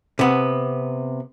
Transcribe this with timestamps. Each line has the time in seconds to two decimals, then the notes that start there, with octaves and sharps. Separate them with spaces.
0.19 C3 B3